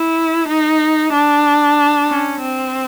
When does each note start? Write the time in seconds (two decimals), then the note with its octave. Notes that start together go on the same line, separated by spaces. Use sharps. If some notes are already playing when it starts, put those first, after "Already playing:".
Already playing: E4
0.48 D#4
1.12 D4
2.08 C#4
2.41 C4